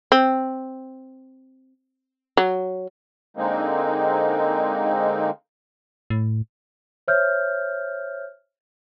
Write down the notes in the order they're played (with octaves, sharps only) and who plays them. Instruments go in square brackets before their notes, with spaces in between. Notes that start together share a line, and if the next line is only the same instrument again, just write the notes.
[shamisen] C4
F#3
[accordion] D3 G#3 A#3 C4 D#4
[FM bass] A2
[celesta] C5 C#5 E5 F6 G6